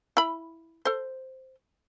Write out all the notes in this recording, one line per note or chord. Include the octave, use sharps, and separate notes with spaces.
E4 B5
A4 C5